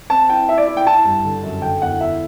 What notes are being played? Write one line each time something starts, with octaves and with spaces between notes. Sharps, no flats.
C4 A5
E4 G5
E4 E5
D5
E4
G5
E4 A5
G2
D3
F#2
D3 G5
E2 F#5
E4 E5